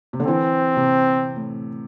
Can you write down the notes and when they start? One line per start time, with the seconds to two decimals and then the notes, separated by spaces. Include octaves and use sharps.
0.13 C3
0.20 D3
0.27 E3 C4
0.76 C3
1.36 A2